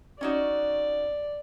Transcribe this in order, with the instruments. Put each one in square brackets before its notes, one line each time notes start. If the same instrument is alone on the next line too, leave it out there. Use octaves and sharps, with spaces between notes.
[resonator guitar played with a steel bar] C#4 D#4 F#4 [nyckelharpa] D5